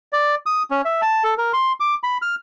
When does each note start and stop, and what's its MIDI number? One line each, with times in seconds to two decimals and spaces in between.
0.13 0.35 74
0.46 0.63 87
0.71 0.82 61
0.85 1.01 76
1.02 1.24 81
1.24 1.34 69
1.38 1.52 70
1.53 1.72 84
1.80 1.95 86
2.03 2.18 83
2.22 2.35 89